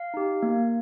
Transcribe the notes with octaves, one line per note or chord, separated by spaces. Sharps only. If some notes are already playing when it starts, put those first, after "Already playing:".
Already playing: F5
D#4 G4
A#3